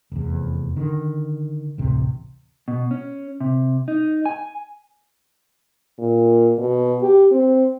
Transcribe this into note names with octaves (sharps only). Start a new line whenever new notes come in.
F1 E2
D3 D#3
A1 D2 C3
B2
C#4
C3
D#4
G#5
A#2
B2
G4
C4